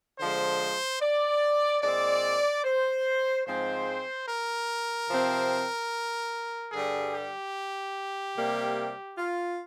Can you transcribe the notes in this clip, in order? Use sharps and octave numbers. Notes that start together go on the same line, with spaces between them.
D3 F3 G#3 C5
D5
A#2 G#3 C4 D5
C5
G#2 F3 G#3 C4 C5
A#4
C3 F3 C4
G2 D3 G3 G#4
G4
C3 G3 A#3
F4